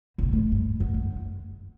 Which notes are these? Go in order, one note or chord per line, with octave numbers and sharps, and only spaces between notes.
B2
C3
A2
G2
F#2
F#2